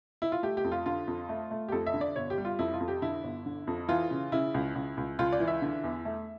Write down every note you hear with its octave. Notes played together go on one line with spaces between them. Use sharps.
E4
F4
A3 G4
G4
F2
F4
D3 F4
F2
A3
A3
G4
F2 A4
E5
D3
D5
G1 C#5
G4
G3
F4
F2 E4
F4
F2
G4
D3 E4
G1
D3
F2
E3 F4
C#3
C#3 E4
C#2
C#2
C#2
C#2 F4
D5
E3
E5
D3
E2
A3